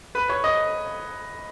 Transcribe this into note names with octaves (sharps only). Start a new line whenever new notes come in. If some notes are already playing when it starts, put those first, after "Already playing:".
B4 B5
C#5 C#6
D#5 D#6